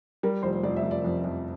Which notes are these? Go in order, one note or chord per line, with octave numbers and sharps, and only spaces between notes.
G3 A#4
F1 C5
F1 D5
E5
F1
D5
F2
F2